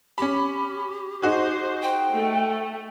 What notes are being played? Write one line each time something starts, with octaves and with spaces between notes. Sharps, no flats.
C#4 G4 B5
D#4 F#4 G#4 C5
G5
A3